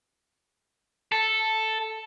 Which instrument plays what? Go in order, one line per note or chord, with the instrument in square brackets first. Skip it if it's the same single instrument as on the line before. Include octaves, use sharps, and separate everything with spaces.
[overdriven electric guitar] A4